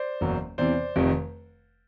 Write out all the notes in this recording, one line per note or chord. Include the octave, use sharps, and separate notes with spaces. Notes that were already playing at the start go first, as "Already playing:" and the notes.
Already playing: C5 D5
F#1 E2 B2 F#3
E2 C3 E3 C5 D5
F1 F2 C3 D#3